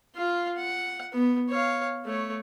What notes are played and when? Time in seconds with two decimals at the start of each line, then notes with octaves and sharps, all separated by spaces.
0.15 F4 F5
0.57 F#5
1.13 B3
1.49 C#5 F5
2.05 A3 C#5